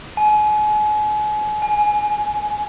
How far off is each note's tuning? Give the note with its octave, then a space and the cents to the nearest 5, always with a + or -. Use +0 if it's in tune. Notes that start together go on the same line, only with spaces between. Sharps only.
G#5 +35
G#5 +10